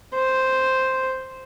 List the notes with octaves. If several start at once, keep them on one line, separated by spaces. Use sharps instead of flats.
C5